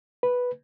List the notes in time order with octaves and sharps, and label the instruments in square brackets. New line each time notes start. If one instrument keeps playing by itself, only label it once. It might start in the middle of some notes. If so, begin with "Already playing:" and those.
[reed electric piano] B4